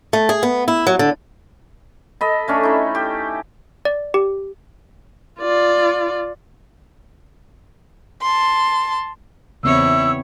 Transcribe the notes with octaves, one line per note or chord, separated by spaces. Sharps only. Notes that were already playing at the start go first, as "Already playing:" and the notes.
A3
G#4
B3
E4
F#3
D3
A4 D#5 B5
A3 C#4 D4
D#4 E4
G4
D5
G4
F4 D5
A5 C6
E2 C#3 B3 C4 E4 C#5 E6